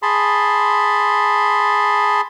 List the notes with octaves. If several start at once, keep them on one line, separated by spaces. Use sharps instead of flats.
G#4 A5 B5 C6